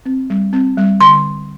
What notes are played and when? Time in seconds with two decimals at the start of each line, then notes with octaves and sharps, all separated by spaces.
0.06 C4
0.30 G3
0.53 C4
0.77 G3
1.01 D3 C6